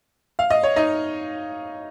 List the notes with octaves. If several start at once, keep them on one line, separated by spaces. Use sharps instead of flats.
F5
D#5
C#5
D#4 D#5